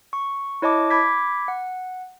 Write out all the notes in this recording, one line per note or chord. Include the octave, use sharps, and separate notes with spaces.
C#6
E4 C#5 D#5 A5 D6
B5 D6 G#6 B6
F#5